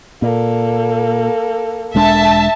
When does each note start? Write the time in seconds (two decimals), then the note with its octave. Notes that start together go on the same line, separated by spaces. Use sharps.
0.22 A#2 A#3 A4
1.95 E1 G#3 D4 E5 A5